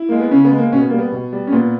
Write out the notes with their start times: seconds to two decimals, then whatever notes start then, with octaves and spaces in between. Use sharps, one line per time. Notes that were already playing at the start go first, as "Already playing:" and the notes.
Already playing: E4
0.09 G#3 A#3
0.20 B3
0.31 C#3 C#4
0.45 B3
0.51 G#3
0.58 A#3
0.72 B2 C#4
0.80 B3
0.90 G3 A#3
0.98 B3
1.12 B2
1.33 G3
1.47 C#4
1.53 A#2 B3